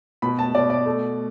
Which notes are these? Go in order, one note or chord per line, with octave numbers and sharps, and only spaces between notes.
B2 B5
A5
B2 D5
D5
A3